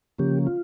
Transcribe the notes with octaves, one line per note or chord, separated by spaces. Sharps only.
C#3 F3 A#3 C#4 G4
F4